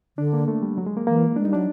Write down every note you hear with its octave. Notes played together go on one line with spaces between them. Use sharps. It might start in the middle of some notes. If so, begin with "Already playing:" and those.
D3 D4
A#3
A3
G3
F#3
G#3
A#3
E3 A#3
G#3 D4
G3 D#4
F#3 D4